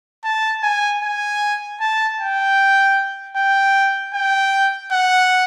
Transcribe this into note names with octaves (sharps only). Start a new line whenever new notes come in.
A5
G#5
G#5
A5
G5
G5
G5
F#5